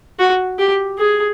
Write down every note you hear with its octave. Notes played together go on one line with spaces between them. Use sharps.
F#4
G4
G#4